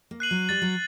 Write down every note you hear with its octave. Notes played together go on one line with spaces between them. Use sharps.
A#3
F#6 C7 D#7 F#7
F#3
G3 A6
F#3